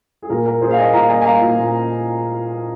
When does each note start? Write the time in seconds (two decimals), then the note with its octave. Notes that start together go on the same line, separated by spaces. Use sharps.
0.22 G#4
0.30 A#2 A#4
0.45 A#3 A#4
0.61 A#2 G#4 C5
0.71 F5
0.77 A#3 D#5 G#5
0.93 A#2 F5 A#5
1.09 A#3 D#5 G#5
1.21 G#5
1.25 A#3 F5 A#5
1.41 A#2
1.57 A#2